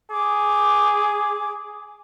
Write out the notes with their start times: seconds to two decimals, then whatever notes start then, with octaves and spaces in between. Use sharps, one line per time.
0.11 G#4 D6